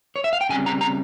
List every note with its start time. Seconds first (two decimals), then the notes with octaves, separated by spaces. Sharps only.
0.16 C#5
0.24 E5
0.33 F5
0.41 G5
0.49 C#3 G3 C4 G#5
0.66 A#5
0.81 A#5